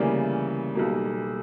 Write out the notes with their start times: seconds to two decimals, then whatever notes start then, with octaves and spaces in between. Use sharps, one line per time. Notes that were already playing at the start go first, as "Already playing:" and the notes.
Already playing: D2 C#3 E3 G3 A#3 D5
0.75 B1 B2 G3 A#3